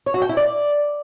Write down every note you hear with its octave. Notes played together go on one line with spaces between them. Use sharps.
C#5
F#4
G5
E4
D5